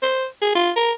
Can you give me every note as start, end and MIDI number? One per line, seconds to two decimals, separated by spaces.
0.03 0.26 72
0.42 0.55 68
0.55 0.71 65
0.76 0.92 70